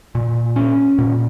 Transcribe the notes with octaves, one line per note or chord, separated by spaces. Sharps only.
A#2
C#4
A#2